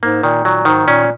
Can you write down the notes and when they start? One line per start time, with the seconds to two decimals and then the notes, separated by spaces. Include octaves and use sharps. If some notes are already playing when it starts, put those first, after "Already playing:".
0.03 G#2 A#3
0.23 A#2 D#3
0.45 A#2 F#3
0.65 G#2 D#3
0.87 A#2 C#4